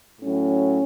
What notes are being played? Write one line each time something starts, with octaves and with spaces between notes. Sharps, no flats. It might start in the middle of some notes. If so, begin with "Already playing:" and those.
A2 F#3 C#4